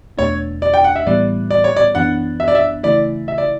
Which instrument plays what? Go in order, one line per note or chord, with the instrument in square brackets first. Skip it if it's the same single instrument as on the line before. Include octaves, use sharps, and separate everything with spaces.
[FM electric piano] E2 B2 A3 D4 [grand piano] C#5
[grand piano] D5
G5
F#5
E5
[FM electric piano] A2 E3 G3 B3 [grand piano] D5
[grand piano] D5
C#5
D5
[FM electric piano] F#2 E3 B3 D4 [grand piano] F#5
[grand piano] E5
D5
E5
[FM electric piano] C#3 E3 A3 E4 [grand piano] D5
[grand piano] E5
D5